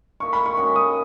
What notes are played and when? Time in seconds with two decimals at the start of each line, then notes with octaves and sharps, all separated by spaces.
0.20 A#3 D#4 A#4 E5 C#6
0.33 B5
0.46 C#6
0.57 D#3 G#3 C#4 F#4 C#6
0.76 D#6